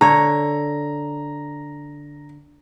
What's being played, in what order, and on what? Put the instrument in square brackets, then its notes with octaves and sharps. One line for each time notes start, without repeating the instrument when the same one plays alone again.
[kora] D3 C#5 [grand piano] A#5